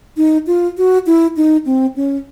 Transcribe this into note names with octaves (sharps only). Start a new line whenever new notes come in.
D#4
F4
F#4
E4
D#4
C4
C#4